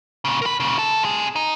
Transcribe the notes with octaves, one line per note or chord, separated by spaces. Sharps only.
A#2 C#3
A#4 B5
A#2 C#3
A4
C3 G#4
D#4